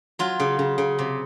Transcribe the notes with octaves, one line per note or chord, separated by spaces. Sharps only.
F#3 F4
C#3
C#3
C#3
C3